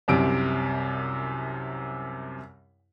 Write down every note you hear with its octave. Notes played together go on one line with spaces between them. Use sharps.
C2 F#2 C3 D7